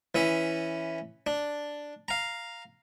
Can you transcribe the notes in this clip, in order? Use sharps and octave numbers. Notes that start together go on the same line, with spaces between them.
E3 C#4 E5
D4
F5 A#5